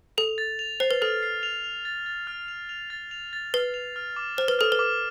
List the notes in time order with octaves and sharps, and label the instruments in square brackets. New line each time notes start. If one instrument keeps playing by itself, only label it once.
[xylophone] A4 [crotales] F7
[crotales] A6
F7
[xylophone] C5 [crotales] C7
[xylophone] B4
[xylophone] A4 [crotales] F6
[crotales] C7
F7
F7
A6
A6
F6
F7
F7
A6
F7
A6
[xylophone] B4 [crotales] C7
[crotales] F7
F6
D6
[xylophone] C5 [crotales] F6
[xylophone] B4
[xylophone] A4 [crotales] F6
[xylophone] B4
[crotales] D6